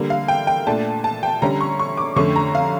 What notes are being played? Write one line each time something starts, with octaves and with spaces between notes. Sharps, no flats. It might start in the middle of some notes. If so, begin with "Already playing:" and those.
Already playing: D3 G3 A#3
F5
G5
G5
A#2 A3 D4 A5
A5
G5
D3 G3 C#4 A#5
C#6
C#6
D6
F2 D3 A3 C#4 C#6
A#5
F5